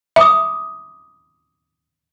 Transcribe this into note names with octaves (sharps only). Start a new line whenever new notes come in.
E5 B5 D6 D#6